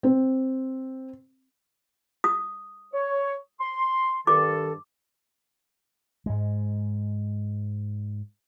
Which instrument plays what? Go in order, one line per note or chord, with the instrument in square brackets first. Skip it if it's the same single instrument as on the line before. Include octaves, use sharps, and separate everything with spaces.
[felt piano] C4
[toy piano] D#6
[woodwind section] C#5
C6
[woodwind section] G2 D#3 A4 [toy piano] D6
[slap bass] G#2 G#3